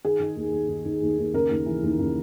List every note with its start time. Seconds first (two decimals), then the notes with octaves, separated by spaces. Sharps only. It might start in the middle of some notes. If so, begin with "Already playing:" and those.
0.05 D#3 G#4
0.20 D#3
0.36 D#2
0.52 D#2
0.69 D#3
0.85 D#3
1.02 D#2
1.18 D#2
1.34 C#3 A#4
1.51 D#2
1.66 E3
1.83 D#2
1.99 C#3